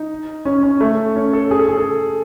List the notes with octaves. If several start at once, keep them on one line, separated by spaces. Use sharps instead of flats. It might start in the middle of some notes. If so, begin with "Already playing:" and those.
Already playing: D#4
C#4
C#4
A3
C#4
A4
G#4
A4
G#4
A4